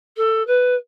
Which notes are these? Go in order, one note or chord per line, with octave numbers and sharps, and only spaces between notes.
A4
B4